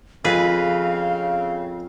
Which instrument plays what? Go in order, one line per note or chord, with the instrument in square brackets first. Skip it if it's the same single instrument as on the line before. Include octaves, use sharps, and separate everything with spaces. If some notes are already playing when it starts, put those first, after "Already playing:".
[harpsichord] F2 [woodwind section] C#3 C4 [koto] G#4 B4 [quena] F5